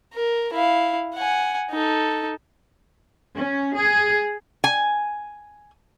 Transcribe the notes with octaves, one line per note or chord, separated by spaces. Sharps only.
A#4
E4 F5
F#5 G#5
D#4 A4
C#4
G#4
G#5